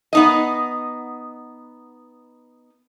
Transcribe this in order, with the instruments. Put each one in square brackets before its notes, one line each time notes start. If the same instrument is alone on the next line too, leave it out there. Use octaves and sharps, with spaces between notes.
[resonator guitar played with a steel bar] B3 D#4 D#5